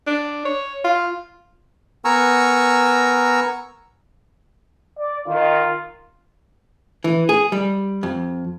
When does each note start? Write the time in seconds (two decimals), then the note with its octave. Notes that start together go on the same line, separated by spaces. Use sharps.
0.07 D4
0.45 C#5
0.84 F4
2.05 B3 A#4 G#5 A#5 C#6 E6
4.98 D5
5.27 D#3 F4
7.04 E3
7.29 G#4
7.52 G3
8.03 F2